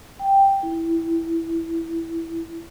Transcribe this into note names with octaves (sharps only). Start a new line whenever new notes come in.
G5
E4